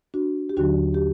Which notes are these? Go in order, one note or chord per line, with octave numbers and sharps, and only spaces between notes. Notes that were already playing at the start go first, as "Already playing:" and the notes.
D4 F#4
G4
D#2 D3 F#3 D4 F#4
G4